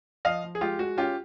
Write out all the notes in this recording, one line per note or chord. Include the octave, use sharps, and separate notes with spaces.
F3 D#5 F5
F3
G#4
G#3 F4 G4
G#3 F#4
C#4 F4 G4